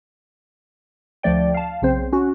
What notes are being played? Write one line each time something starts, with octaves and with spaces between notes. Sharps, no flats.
D2 F3 A3 D5 G5
F5 A5
B1 C#3 C4 C5
C#4 F#4